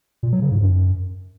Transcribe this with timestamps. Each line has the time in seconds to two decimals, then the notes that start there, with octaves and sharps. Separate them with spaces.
0.23 A#2
0.32 F#3
0.42 C#3
0.51 G#2
0.61 F#2